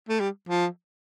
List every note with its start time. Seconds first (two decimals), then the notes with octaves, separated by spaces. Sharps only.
0.09 A3
0.20 G3
0.49 F3